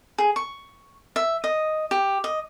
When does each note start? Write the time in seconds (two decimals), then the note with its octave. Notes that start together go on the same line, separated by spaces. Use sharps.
0.18 G#4
0.36 C#6
1.16 E5
1.44 D#5
1.91 G4
2.24 D#5